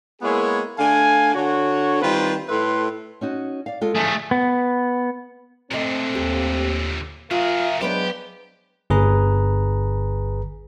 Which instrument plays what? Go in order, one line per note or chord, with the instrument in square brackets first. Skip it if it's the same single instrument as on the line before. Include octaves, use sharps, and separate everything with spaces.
[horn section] G#3 A#3 B3 E4 G#4 C#5
D3 A3 F5 G#5
D3 F#4 C#5
D#3 G3 C4 F4 B4 C5
A2 A4 B4 E5 C6
[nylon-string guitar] C#4 D#4 F#4
D5 F5
G#3 F4 A4
[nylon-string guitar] D3 F3 D4 [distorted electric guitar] A3 G#4
[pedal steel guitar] B3
[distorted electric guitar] A#2 D3 [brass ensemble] A3 C4 [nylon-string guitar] C#5 D#5
[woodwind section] D#2 [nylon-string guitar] G4
[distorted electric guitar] F#3 G#4 [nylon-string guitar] F4 [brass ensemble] A#4 E5 [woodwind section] F5
[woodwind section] F#3 [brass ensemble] G#3 D4 [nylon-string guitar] B3 B4 C5 [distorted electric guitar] G4
[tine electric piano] G1 G#4 B4 A#5